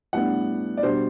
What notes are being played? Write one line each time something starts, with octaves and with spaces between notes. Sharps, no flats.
A2 G3 B3 D4 F#5
D5
B2 G3 D4 C5